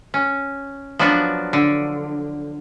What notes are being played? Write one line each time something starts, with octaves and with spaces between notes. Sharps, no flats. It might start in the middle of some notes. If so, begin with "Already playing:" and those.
C#4
F3 F#3 B3 D4 F#4
D3